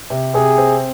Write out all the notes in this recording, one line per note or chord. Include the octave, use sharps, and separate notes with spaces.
C3
C3 G#4
C4